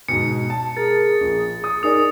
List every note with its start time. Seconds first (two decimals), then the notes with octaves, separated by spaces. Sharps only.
0.08 G#2 B2 C#7
0.50 A5
0.77 G#4 A#4 A6
1.21 A#1
1.64 D#6
1.83 D#4 G#4 A#4 D5 D#6